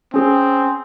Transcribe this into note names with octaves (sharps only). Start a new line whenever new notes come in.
C4 C#4 G#4